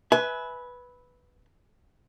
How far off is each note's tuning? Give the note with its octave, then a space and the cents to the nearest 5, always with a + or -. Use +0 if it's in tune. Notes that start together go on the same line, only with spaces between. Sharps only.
B4 +0 E5 -20 G#5 +25